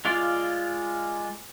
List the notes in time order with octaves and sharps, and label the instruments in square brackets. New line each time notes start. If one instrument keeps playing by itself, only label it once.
[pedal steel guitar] G#3 F4 D5 F5